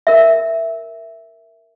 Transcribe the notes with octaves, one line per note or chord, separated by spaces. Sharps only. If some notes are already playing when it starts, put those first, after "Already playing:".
A#4 E5